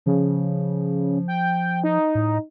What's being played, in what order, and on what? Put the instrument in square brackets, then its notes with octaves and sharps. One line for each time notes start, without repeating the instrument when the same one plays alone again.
[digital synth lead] C#3 [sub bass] F3
[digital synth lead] G5
D#4
[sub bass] A2